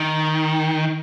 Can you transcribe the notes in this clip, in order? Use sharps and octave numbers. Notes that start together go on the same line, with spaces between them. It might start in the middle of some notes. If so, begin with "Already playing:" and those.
Already playing: D#3